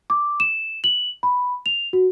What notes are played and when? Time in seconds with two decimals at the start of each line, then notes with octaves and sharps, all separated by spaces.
0.10 D6
0.40 E7
0.84 F#7
1.23 B5
1.66 F7
1.93 F#4